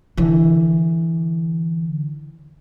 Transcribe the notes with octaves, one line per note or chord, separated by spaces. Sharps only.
D3 E3